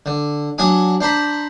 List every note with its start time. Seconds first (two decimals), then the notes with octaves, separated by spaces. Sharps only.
0.06 D3
0.58 F#3 D4 G#5 D#6
1.01 D4 C5 A#5 B5